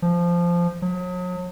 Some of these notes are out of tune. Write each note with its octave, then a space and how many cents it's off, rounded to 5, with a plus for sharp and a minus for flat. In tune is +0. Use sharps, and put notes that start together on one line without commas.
F3 -10
F#3 -40